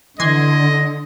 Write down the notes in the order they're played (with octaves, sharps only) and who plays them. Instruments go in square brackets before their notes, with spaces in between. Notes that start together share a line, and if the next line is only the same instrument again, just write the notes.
[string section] D3 [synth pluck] E3 C6 G#6 [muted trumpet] D#5